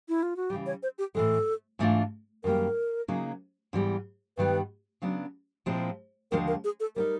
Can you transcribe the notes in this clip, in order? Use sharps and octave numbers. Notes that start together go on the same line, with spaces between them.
E4
F4
F#4
C#3 E3 G3 G4
C#5
C5
G4
A2 E3 G#3 A4
G#2 E3 A3 D4 F4
F#2 D#3 G3 A#3 A#4
C#3 F#3 A#3 D#4 G#4
G#2 E3 G3 B3
G2 D#3 G3 B3 B4
C#3 F#3 B3 D4
A#2 F3 G#3 C4 E4
D#2 D3 F3 G#3 A#4
A#4
G#4
A4
G3 C4 D#4 A#4